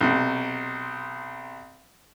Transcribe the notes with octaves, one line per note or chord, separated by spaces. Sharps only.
B1 C3